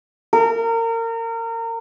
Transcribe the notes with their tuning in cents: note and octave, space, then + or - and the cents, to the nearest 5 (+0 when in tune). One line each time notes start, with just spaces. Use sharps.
A#4 -30